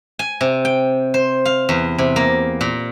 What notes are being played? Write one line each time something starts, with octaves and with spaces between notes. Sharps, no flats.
G#5
C3
G5
C5
F5
E2
C3
A#3
A#2